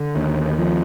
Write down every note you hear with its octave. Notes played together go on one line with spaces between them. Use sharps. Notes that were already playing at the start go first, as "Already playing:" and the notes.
Already playing: D3
D#2
F3